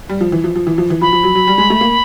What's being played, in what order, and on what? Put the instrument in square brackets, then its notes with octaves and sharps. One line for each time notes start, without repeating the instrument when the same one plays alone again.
[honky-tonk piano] G3
F3
E3
F3
F3
E3
F3
E3
[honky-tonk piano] F3 [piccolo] B5
[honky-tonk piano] F3
F#3
F#3
G3
G#3
A3
A#3